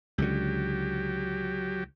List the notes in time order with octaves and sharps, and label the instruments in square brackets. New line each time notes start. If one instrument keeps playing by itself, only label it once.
[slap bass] C#2 D3 [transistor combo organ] F#3 G4